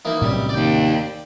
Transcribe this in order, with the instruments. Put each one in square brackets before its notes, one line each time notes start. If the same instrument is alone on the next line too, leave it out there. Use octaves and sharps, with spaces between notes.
[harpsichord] E3 A#3 D#4
[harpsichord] B1 G3 [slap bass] A2 C3 C#4
[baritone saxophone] D#2 [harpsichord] D5 G5